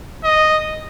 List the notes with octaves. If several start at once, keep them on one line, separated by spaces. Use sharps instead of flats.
D#5